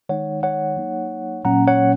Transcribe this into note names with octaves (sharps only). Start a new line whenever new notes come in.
D#3 G#3 D#4 C#5 F#5
C#5 F#5
F#3 A#3 D#4
A#2 F#3 A#3 C#4 F#5 A#5
C#5 F#5